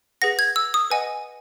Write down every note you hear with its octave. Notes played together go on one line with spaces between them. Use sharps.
G#4 B4 F#5 A#6
G#6
E6
D#6
B4 D#5 F#5 G#5